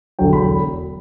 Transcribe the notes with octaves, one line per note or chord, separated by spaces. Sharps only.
E1 E2 D3 F#3 G5
B5